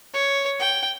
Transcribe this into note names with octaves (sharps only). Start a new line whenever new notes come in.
C#5
G5